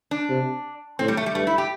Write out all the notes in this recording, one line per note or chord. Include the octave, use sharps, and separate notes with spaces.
D4
C3
A2 C4
G3
A3
G3
G2 A3
E4
G4